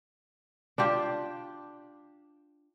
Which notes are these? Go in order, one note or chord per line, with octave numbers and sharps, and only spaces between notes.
D4 F4 G4